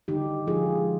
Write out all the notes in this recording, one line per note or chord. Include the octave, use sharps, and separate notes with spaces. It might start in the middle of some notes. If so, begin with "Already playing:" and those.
D3 D#4 G4
F3 G#3 F4 G#4